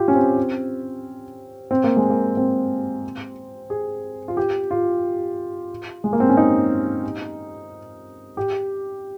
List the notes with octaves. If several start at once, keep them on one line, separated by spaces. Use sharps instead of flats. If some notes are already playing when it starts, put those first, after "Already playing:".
Already playing: F4 G4
C#4
C4
C4
A#3
G#3
A#3
C4
G#4
F4
G4
F4
G#3
A#3
C4
C#4
D#4
G4